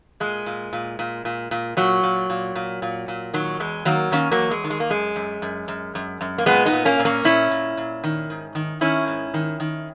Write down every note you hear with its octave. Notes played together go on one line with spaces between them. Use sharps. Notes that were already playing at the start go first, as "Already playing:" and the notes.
A#2 G#3
A#2
A#2
A#2
A#2
A#2
A#2 F#3
A#2
A#2
A#2
A#2
A#2
D#3 F#3
E2 G#3
D#3 F#3 A#3
D#3 A#3 C#4
F#3 A#3
E2
G#3
D#3
G#3
A#3
F#2 G#3
F#2
F#2
F#2
F#2
F#2
A#3
A#2 G#3 B3
B3 D#4
A#2
A#3 C#4
A#2
A#3 C#4
A#2 C#4 E4
A#2
A#2
D#3
G#2
D#3
D#3 C#4 E4
G#2
D#3
D#3